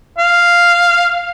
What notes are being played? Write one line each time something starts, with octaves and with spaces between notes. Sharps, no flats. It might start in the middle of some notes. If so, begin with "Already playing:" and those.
F5